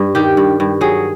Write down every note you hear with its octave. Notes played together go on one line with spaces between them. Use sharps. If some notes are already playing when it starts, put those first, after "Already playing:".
Already playing: G2
D#3 G4
G2
G2
F#3 G#4